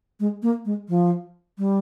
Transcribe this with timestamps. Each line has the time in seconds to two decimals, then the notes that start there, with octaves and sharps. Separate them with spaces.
0.20 G#3
0.43 A#3
0.65 G#3
0.89 F3
1.58 G3